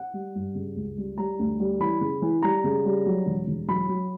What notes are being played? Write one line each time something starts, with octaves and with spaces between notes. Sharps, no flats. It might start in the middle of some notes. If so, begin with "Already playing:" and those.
Already playing: F#5
G3
G2
C#3
C#2
G3
G3 A#5
D2
G3
E3 B5
C#3
E3
G3 A#5
C#3
G3
F#3
E1
E1
F#3 B5
F#3